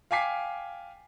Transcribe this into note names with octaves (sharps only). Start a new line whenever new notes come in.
F5 G5 G#5 D6 B6 C7